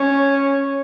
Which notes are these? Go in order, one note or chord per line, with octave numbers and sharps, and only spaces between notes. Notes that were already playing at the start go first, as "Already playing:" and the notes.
Already playing: C#4